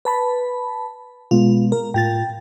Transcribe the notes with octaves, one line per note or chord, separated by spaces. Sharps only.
B4 A5 B5
B2 G#3 B3 F4
A#4
A2 F4 G5 A6